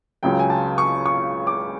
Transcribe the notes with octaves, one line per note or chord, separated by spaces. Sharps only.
C#2 C#3 F#3 G5
G#5
A5
C#6
C#6
D6